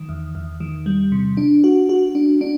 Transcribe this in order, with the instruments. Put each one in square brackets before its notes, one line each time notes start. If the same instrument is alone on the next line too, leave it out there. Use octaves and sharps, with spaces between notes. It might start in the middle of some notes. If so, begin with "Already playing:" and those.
Already playing: [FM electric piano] D#3
E2
E2
D#3
G3
C3
D4
F#4
F#4
D4
D4